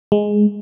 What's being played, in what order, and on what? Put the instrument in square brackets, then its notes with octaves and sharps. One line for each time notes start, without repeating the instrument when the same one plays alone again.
[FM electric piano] G#3